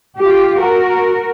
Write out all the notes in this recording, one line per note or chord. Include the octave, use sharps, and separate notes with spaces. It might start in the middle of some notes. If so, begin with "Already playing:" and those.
F4 G4
F#4 A#4